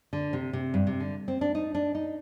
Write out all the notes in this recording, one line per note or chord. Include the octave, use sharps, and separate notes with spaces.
D3
C3
C3
G2
C3
D3
C4
D4
D#4
D4
D#4